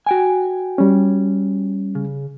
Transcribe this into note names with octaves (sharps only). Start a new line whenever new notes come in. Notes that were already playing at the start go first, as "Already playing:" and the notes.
F#4 G5 G#5
G3 C#4
C#3